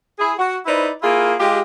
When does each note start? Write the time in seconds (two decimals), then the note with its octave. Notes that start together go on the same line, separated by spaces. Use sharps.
0.19 E4 G#4
0.38 F#4
0.66 D#4 E4 B4 C5 D5
1.02 A#3 E4 F4 G#4
1.38 G#3 F4 G4